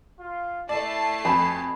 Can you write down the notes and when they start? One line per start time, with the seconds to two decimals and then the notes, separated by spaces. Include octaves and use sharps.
0.18 F4
0.69 A3 E4 D5 A5 C7
1.25 F2 G#5 B5